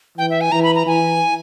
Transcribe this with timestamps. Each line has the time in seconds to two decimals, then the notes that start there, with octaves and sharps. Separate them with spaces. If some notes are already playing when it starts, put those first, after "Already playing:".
0.18 E3 G5
0.30 E5
0.41 G#5
0.52 E3 A#5
0.63 B5
0.75 A#5
0.87 E3 G#5